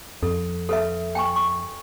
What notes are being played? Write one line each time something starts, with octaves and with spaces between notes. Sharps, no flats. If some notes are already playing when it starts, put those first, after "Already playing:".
F2 A4
A4 B4 E5
G5 G#5 C#6
C#6